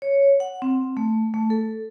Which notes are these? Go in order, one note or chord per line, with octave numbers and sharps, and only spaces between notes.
C#5
F#5
C4
A3
A3
A4